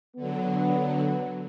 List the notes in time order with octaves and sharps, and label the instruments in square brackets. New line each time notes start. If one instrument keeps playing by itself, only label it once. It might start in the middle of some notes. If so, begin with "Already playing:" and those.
[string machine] D3 F#3 [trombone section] B3